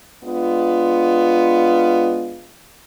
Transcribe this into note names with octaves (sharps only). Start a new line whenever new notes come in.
G#3 B3 D4 F4